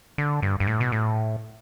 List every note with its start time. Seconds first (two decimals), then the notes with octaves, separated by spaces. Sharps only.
0.18 D3
0.42 G2
0.60 G2
0.67 A2
0.80 B2
0.92 A2